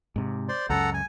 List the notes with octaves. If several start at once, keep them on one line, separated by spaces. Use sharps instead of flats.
G#2 C3
C5 D5 C6
C#2 F#2 C#3 A4 F#5 A#5
G#5